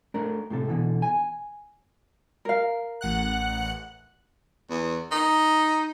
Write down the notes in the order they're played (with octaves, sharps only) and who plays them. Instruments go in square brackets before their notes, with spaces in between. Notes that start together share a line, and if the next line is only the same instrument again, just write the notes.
[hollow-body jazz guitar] A3 D4 A#4
A2 C3 A4
B2 D3 E3
G#5
[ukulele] A#4 F5
[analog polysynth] A1 F#5 F#6
[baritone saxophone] E2
D#4